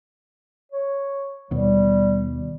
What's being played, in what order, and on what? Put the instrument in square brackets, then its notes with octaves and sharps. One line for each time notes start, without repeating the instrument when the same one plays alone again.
[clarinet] C#5
[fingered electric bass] D#2 B2 [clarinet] G3